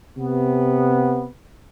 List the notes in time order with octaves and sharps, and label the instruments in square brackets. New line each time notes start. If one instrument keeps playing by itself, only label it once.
[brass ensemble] C3 B3